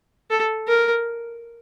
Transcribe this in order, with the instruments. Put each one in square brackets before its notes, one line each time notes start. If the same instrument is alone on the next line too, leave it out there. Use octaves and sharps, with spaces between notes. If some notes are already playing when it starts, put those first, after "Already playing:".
[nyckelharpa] A4
A#4